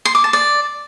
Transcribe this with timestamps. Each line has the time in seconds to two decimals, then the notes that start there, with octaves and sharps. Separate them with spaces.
0.05 C6
0.15 D6
0.24 A5
0.33 D5